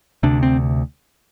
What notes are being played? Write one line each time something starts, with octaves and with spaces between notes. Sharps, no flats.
D2 C3 D4
C4